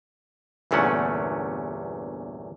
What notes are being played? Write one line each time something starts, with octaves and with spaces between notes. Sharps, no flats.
G1 E2 A#2 A3 C#4 F#5